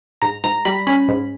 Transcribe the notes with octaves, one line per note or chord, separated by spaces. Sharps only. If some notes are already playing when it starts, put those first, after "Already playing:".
G#2 A#5
G#2 A#5
G3 B5
C#4 B5
G#2